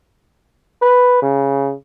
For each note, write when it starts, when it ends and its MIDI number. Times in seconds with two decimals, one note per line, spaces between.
0.82 1.18 71
1.22 1.74 49